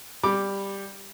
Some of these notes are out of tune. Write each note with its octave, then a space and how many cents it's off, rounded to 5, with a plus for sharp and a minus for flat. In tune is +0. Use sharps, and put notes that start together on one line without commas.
G3 +10 B5 -10 D6 +0